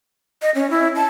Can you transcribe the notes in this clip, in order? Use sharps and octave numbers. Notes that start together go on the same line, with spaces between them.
D#5
C#4
E4
A5